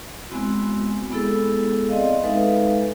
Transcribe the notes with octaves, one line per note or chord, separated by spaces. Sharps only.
G#3 B3 C4 E4 F#4
G#3 B3 E4 G#4 A4
C4 D5 D#5 F5
G#3 D#4 A4 B4 E5 F5